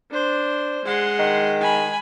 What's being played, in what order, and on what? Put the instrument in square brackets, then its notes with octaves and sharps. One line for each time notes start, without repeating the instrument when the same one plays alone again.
[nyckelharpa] D4 C5
[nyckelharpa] G#3 [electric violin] F#5 C6
[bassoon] D#3
[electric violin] G#5 B5